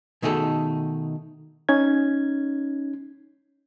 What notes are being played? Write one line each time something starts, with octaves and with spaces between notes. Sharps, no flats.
B2 D#3 A3 D#4 G#4 A4
C#4 D#4 G#6